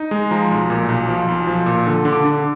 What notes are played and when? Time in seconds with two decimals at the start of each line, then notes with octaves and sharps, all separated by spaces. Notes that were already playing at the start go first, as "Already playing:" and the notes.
Already playing: D#4
0.11 G#3
0.31 F3 A#5
0.51 B1
0.70 A#2
0.89 B1
1.09 F3
1.28 B1
1.47 F3
1.66 A#2
1.87 D3
2.05 D3
2.13 D6
2.25 D3